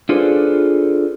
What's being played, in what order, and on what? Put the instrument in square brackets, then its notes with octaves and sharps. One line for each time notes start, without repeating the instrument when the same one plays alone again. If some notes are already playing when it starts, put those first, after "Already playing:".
[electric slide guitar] D4 F4 G#4 A4 B4 C5